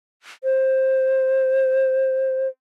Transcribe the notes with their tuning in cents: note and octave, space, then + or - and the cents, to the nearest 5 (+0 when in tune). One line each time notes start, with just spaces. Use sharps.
C5 +10